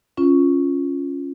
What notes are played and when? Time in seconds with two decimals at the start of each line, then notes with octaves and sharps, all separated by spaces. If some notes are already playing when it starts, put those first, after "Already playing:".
0.17 C#4 F4